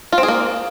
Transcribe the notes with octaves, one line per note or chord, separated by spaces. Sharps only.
F4
C4
G#4
A#3